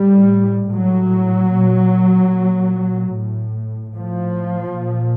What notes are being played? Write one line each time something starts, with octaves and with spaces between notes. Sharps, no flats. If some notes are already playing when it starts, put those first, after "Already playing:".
Already playing: A2 G3
A2 F#3
A#2
A#2
A2
A2 F3
A#2